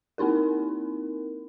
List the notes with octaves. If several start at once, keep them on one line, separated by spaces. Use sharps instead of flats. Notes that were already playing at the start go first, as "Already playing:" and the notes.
A#3 C4 D#4 E4 A#4